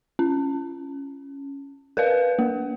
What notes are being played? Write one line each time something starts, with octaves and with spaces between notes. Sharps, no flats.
C#4
A#4 B4 F5
A#3